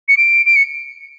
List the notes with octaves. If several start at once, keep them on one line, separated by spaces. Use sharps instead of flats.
C#7
D7
D7
C#7